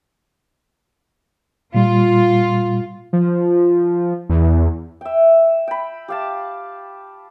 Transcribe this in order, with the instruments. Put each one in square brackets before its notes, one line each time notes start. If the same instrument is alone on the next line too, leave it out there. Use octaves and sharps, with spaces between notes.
[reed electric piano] A#2 G3 [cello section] F4
[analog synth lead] F3
[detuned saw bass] E2
[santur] E5 G5
G5 B5
G4 F5 A5